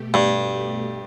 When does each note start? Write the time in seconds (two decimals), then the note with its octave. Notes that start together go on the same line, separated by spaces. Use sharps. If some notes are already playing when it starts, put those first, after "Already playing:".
Already playing: B2 A3 G4
0.14 G2